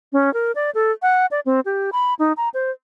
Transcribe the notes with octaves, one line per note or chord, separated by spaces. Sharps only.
C#4
A#4
D5
A4
F#5
D5
C4
G4
B5
D#4
A#5
C5